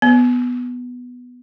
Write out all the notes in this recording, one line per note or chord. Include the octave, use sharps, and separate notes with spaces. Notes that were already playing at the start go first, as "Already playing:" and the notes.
B3